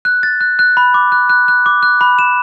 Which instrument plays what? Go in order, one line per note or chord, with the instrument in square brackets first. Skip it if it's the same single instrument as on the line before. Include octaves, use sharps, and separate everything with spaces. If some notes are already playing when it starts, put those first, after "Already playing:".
[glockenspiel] F#6
A6
F#6
F#6
B5
D6
F#6
F#6
F#6
D6
F#6
B5
E7